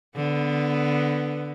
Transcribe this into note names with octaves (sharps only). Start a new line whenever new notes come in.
D3 B3